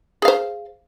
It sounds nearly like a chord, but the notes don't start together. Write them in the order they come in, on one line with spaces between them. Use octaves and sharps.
G#4 F5 C5